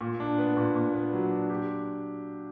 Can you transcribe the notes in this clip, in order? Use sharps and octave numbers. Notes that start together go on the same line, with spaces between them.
A#2
D4
B3
A#2
A#2
B3
F#3
D4
G4